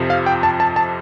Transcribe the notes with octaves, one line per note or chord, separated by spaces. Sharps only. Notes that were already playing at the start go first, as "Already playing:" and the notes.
Already playing: F2 C3 F3
F5
G5
A5
A5
A5